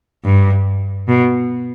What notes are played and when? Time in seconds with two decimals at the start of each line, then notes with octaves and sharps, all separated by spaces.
0.25 G2
1.08 B2